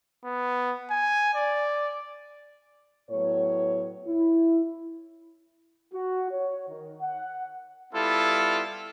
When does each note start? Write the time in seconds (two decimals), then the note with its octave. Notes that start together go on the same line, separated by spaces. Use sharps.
0.25 B3
0.90 G#5
1.35 D5
3.11 A2 F#3 B3 C#5
4.06 E4
5.93 F#4
6.31 C#5
6.68 D#3
7.01 F#5
7.94 G3 B3 E4 F4 A4